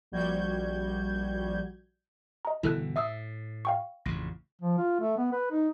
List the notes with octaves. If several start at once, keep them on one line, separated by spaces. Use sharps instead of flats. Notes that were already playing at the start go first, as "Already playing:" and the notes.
A#1 G3 F#4 G6 G#6
D#5 A#5
G1 B2 E3 E4 A4 F#6
A2 E5 D#6 E6
F5 G5 C#6
A1 F2 C#3 A#6
F3
F4
A3
B3
B4
D#4